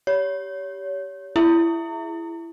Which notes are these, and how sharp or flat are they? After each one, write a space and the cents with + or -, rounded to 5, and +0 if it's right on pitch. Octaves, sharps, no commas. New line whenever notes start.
G4 +0 C#5 +30
E4 +20 G#4 +0 E5 +0